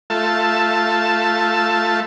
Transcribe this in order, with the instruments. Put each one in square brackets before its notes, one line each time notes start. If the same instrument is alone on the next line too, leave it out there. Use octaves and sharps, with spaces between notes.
[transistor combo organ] A3 F4 E5 A5